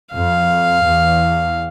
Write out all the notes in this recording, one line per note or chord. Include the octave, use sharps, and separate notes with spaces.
F2 F5
E2